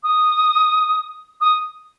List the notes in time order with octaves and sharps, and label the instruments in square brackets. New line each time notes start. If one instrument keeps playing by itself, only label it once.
[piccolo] D#6
D#6